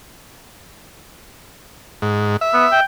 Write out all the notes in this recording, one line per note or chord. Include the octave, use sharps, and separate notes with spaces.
G#2
E5
B3
G5